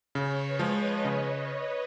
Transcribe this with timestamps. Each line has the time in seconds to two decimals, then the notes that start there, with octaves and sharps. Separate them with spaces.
0.14 C#3 C#5
0.45 B4
0.59 F3 G#3
0.74 D#5
1.04 C#3 C#5